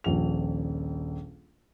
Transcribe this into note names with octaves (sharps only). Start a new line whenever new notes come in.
D#1 A#1 F7